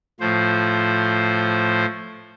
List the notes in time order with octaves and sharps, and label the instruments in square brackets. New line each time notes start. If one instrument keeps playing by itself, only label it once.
[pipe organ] A2 F3 C5